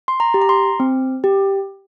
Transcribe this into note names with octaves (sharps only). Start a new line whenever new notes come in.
C6
A#5
G4
A#5
C6
C4
G4